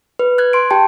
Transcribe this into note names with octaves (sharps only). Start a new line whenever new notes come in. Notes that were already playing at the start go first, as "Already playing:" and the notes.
B4
F#6 G#6
C6 D7
G4 G5 A5